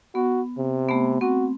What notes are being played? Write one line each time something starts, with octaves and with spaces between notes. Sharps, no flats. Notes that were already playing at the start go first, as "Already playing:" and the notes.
B3 F#4
C3
A3 B3
C4 F#4